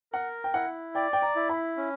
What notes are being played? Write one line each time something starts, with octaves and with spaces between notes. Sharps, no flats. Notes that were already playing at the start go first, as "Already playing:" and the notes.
A#4 F#5
G5
E4 F#5
D5 G5
G5
A#5
E4
B5
C#4